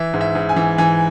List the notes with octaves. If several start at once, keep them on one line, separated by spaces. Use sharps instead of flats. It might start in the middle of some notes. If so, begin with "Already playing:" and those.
Already playing: E3 E5
G#2
E5
G#2
G#5
E3
E3 G#5